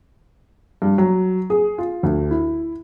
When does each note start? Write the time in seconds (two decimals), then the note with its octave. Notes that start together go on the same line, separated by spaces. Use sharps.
0.82 G2
0.98 F#3
1.50 G#4
1.78 F4
2.03 D2
2.31 E4